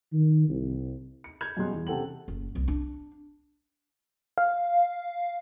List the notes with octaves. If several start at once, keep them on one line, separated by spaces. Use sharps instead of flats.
D#3
C2
C#7
G6 G#6 F7
F#2 B2 G3 G#4 C6 F#6
E2
C3 C#4 A4 F#5 G5 F#7
F#1
C2 F#3
D4
F5